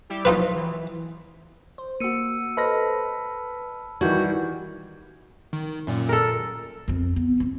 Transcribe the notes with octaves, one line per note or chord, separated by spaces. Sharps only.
G3 E4 G4
F3 F#3 D#4 F4 B4
E3
C5
A#3 F#4 E6 C#7 D#7
A4 B4 C5 D#5 A5 B5 F6 A#6
D#3 E3 G3 F#4 G6 G#6
D#3
F#2 A#2
A4 A#4
F2 C4
B3
G1 C4